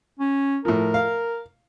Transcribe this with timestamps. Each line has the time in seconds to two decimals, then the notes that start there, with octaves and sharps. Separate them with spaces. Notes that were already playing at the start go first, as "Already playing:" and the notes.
0.20 C#4
0.65 A2 F3 A#4
0.94 F5